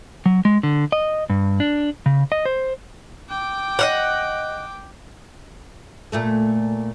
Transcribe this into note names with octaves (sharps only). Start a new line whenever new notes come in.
F#3
G#3
D3
D#5
G2
D4
C#3
D#5
C5
G5 D6
D#5 F5 F#5
A#2 A3 A4